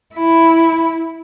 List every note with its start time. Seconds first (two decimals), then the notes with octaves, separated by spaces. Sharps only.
0.15 E4